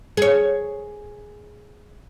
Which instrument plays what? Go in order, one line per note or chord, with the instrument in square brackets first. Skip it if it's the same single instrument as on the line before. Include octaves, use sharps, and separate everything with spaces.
[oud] G#4 C#5